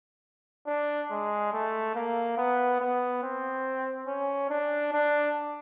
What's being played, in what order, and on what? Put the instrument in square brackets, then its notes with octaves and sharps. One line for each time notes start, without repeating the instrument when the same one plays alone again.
[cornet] D4
G#3
A3
A#3
B3
B3
C4
C#4
D4
D4